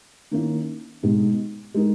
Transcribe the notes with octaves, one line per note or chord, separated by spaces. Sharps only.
D#3 A#3 C#4 E4
B2 G#3 D#4
G#3 D#4 A#4